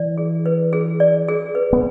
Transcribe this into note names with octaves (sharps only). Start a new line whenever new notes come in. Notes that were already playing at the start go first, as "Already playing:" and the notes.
Already playing: E3 D5
G#4
B4
G#4
D5
G#4
B4
B3